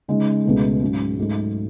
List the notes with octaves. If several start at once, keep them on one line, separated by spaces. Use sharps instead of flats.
C#3 G#3 D#4
C#2 B2 A3
G#2 F#3 C#4
G#2 F#3 A3 D#4